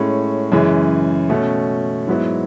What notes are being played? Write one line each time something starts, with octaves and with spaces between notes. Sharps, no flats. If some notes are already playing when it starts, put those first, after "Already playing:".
Already playing: A2 G#3 C#4
F#2 C#3 E3 G#3
B2 A3 C#4
G#2 F#3 B3 E4